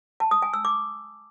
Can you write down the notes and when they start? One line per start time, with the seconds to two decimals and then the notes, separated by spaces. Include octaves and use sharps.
0.20 A5
0.31 D#6
0.42 G#5
0.54 E6
0.65 D6